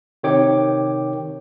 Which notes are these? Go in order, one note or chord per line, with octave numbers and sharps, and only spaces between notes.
C3 D#3 C#5 G5 D6